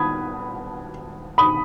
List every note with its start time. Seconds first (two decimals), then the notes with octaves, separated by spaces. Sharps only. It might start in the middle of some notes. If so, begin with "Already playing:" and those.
Already playing: B3 B5 D#6 G#6
1.38 B5 D#6